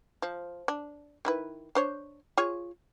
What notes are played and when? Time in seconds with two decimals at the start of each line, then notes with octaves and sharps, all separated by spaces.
0.22 F3
0.68 D4
1.25 D#3 E4 B4
1.75 D4 C5 C#5
2.37 F4 G#4 C#5